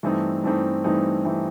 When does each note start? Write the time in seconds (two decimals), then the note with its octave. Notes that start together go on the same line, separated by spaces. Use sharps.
0.03 G2 E3 A3 C4 D#4
0.43 G2 E3 A3 C4 D#4
0.84 G2 E3 A3 C4 D#4
1.25 E3 A3 C4 D#4